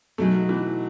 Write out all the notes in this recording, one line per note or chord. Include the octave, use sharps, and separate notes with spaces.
B2 F#3 A3 B3 D#4 G#4
E3